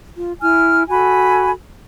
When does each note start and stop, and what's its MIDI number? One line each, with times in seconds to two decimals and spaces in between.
0.17 0.33 65
0.40 0.83 64
0.40 0.83 80
0.40 0.83 89
0.89 1.51 66
0.89 1.51 69
0.89 1.51 80
0.89 1.51 83